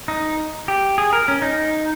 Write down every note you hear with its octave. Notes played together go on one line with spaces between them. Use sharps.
D#4
G4
G#4
A#4
C#4
D#4